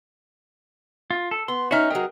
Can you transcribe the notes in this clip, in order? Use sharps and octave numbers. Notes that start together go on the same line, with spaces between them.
F4
A4
B3 C6
C#4 D#4 F#4 E5 F6
F#3 G#4 A#4 D#5 G5